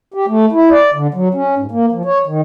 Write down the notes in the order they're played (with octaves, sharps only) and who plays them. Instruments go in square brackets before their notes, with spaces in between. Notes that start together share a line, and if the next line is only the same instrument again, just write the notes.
[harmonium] G4
A3
E4
D5
D3
F#3
C#4
G#2
A#3
F3
C#5
D#3